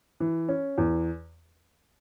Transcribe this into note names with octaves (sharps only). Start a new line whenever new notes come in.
E3
C#4
E2